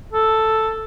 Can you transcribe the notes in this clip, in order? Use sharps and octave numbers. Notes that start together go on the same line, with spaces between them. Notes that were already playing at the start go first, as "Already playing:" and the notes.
A4